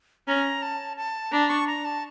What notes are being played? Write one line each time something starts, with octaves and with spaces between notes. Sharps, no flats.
C#4 A#5
A5
A5
D4 A#5
C#6
A#5
A5